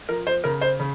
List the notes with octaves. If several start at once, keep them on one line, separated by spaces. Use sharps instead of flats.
F3 A#4
C5
C#3 A#4
C5
C#3